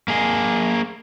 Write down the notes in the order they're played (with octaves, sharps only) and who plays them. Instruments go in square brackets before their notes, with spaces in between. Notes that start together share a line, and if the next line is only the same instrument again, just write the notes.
[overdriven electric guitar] A#3 G#4